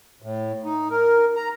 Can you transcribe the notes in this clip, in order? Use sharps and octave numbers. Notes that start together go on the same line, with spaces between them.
A2
D#4
A#4
A#5